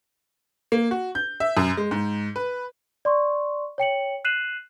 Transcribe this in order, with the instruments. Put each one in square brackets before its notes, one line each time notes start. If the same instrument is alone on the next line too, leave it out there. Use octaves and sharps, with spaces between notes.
[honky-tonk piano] A#3
F#4
G6
E5
F#2
G#3
G#2
B4
[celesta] D5 C6 C#6
C#5 G5 C#7 F#7
F#6 C7 D#7 E7 F#7